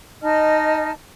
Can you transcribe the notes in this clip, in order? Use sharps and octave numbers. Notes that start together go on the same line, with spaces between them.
D#4 D#5 A5 F6